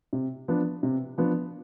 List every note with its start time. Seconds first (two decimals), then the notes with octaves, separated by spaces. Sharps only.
0.13 C3
0.48 F3 B3 D4
0.83 C3
1.18 F3 B3 D4